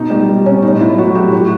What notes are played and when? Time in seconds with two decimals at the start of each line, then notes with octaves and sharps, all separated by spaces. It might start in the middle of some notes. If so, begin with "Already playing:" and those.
Already playing: B2 D#4
0.10 G3 D#4
0.29 G3
0.46 B2 C#4
0.62 A2 D#4
0.80 F#3 E4
0.98 F#3 F#4
1.15 A2 G4
1.32 A2 F#4